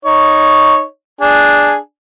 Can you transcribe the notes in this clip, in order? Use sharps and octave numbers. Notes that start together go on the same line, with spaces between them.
D#4 C#5
D4 G#4